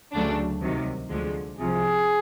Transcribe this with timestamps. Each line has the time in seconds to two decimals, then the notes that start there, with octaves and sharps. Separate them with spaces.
0.13 D2 C#3 F#3 A3 D4
0.61 C2 C3 D#3 F#3
1.10 D2 D3 F3 G#3
1.59 C2 C3 F3 G#4